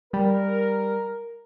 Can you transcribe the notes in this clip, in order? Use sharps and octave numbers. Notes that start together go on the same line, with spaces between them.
G3 A#4